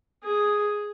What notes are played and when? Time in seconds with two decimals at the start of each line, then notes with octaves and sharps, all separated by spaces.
0.24 G#4